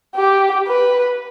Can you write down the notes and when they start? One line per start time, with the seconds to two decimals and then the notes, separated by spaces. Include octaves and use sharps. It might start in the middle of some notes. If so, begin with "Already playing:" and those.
0.16 G4
0.67 B4